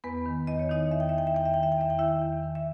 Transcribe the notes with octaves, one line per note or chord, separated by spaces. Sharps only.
E2 B3 B4
D#3
E2 D#5
C#5
D#3 D#4 D#5
E2 E5
G5
E5
D#3 G5
E5
E2 G5
E5
D#3 G5
E5
G5
E2 E5
G5
D#3 E4 E5
E2
D#3
E5